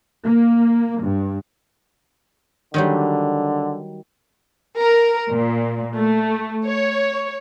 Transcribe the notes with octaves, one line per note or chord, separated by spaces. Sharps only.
A#3
G2
D3 D#3 F#3 G3
A#4
A#2
A3
C#5